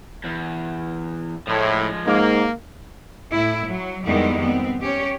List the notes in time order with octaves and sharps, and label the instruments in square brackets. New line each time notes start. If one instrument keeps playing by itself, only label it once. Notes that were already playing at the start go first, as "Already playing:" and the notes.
[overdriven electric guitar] E2
[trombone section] A2 [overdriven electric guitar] F3 G#3
[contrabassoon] G#2 [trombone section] A#3
[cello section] A2 E4
F#3
F2 D#3 G3 G#3 B3 E4
B3 C4
C#4 G4 C#5